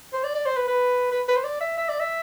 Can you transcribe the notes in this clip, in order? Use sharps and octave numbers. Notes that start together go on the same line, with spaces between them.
C5
D5
D5
C5
B4
B4
B4
B4
C5
D5
E5
E5
D5
E5